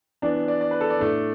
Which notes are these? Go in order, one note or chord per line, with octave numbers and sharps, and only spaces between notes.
E3 B3 D4 D5
D5
D5
B4
A4
D5
A2 A3 D4